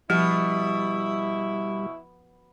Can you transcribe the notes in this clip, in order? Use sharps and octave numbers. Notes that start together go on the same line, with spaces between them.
B2 F3 G3 E4